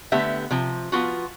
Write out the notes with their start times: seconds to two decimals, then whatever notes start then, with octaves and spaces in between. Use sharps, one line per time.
0.12 D3 A3 B3 G4 E5
0.51 C3 F3
0.92 F3 B3 F4 F#4